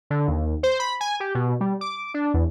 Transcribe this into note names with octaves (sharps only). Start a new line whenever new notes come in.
D3
D#2
C5
B5
G#5
G4
B2
G3
D6
D4
E2